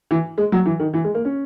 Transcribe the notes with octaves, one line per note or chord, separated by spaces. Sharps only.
E3
G#3
F#3
E3
D#3
E3
G#3
A#3
C#4